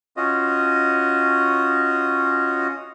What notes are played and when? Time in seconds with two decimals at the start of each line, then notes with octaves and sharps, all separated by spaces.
0.17 C#4 F4 F#4 D#5